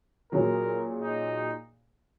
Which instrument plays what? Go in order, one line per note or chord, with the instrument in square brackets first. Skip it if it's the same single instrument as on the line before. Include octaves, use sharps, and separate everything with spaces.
[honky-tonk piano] A#2 F#3 C#4 G#4 [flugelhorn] A#4
[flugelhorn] D#4